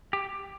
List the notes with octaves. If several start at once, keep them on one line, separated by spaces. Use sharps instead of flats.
G4